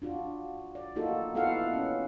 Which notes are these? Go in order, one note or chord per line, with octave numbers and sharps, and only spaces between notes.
D4 F4 F#4
D5
A#3 D#4 F4 F#4 A4
B3 E4 F4 A4 F5 F#5
C#4